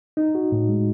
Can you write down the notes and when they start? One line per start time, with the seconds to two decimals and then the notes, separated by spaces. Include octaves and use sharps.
0.17 D#4
0.35 F#4
0.52 A2
0.69 G#3